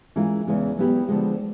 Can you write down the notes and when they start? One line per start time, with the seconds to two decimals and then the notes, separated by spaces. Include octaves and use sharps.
0.16 E3 G#3 C#4 F4 A#4
0.47 E2 C#3 E3 G#3 C#4
0.77 F#3 B3 E4 G4 B4
1.08 D3 F3 G#3